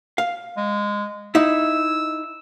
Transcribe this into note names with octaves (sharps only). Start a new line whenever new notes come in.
F5
G#3
D#4 E4 E6